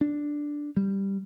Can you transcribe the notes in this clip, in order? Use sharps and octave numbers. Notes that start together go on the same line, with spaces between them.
D4
G3